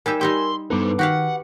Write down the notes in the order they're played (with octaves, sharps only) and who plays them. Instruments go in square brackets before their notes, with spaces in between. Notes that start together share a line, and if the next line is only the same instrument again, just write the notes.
[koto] G3 D#4 G4 [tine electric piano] A#4 [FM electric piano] G#5 E6
[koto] G3 D#4 G4 [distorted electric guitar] C6
[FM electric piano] G2 B3 A4 [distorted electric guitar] D#4 C5 [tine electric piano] B4 D6
[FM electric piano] D#3 [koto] F#4 G4 F5 [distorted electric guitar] F#5